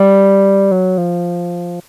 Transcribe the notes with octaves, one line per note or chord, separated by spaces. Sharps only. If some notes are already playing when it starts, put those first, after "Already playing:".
Already playing: G3
F#3
F3